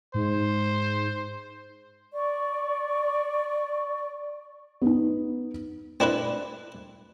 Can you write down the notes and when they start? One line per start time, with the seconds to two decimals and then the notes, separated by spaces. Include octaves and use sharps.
0.14 G#2 C5
2.13 D5 C#6
4.82 B3 D#4
6.00 C4 D4 E4 B4